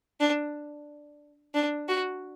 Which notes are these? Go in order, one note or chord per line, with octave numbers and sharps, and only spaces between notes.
D4
D4
F#4